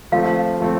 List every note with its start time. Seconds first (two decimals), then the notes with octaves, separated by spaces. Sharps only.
0.12 F3 A3 C4 F4 F5
0.60 F3 A3 C4